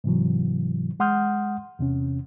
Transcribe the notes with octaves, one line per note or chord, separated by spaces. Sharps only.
G#2 C3 E3 F#3
G#3 F#5 C6 D#6 F6 G6
E2 C3 C#4